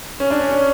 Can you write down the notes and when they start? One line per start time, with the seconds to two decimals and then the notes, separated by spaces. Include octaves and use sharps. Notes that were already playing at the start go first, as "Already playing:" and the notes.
0.20 C#4
0.31 D4
0.41 C#4
0.51 C#4